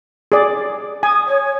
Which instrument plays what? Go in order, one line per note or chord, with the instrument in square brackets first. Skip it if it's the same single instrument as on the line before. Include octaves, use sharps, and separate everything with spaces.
[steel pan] G#4 D5
[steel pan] G#5 [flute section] D#6
[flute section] C#5